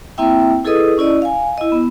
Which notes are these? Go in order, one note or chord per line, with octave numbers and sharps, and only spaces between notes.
A#3 C4 E4 E5 G5
E4 G#4 A4 B4 D#5 D#6
C#4 E4 D5 D#5
F5 G#5
E4 D#5
B3